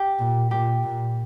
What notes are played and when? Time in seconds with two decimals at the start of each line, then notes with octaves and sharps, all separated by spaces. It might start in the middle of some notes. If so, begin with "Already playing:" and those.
Already playing: G4
0.19 A#2
0.51 A#2 G4
0.83 A#2